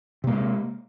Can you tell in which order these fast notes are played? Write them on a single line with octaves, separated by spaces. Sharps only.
C3 A#3 G#3